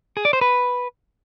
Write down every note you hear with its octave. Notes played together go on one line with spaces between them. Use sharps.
G#4
D5
C5
B4